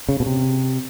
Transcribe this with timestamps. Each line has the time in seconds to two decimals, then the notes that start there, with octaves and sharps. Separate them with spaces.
0.09 C#3
0.20 B2
0.26 C3